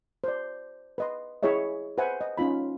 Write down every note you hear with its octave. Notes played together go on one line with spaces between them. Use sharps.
C5 D5
B4 D#5 C6
E4 G#4 C#5 D#5 E5
B4 C5 E5 F#5 G#5
D#5
C#4 D#4 F4 B5